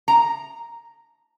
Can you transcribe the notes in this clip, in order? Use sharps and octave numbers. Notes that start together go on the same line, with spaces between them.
A#5